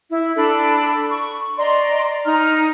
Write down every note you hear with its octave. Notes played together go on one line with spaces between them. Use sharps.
E4
D4 A4 B5
C#6
D5 D#5 A#5 C6
D#4 A#5 F6